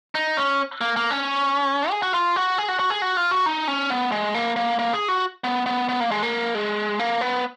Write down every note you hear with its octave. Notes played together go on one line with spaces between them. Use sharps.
D#4
C#4
A#3
A#3
C#4
G#4
F#4
F4
F#4
G#4
F#4
F#4
G#4
F#4
F4
F#4
D#4
C#4
B3
G#3
A#3
A#3
A#3
G#4
F#4
B3
B3
B3
A#3
G#3
A#3
G#3
A#3
B3